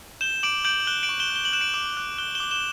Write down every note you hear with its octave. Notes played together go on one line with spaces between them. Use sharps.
G6 E7 G7
D6 D7 F#7
G6 D7 F#7
F#6 E7 G7
D7 F#7
C#6
E7 G7
F#6
G7
F#7
F#6 E7
D7 F#7
D6
F#6
F#6 G7
E7 G7
D6
E7 G7